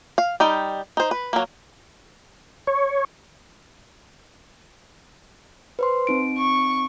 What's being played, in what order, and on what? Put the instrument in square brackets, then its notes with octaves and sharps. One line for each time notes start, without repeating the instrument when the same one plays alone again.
[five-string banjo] F5
G3 D#4 G5
D#4 C5
B4
F#3 A#3
[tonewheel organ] C#5
[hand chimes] B4 C5 C6
C4 D#4 D7
[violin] C#6